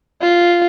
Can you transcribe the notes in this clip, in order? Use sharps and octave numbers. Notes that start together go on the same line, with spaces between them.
F4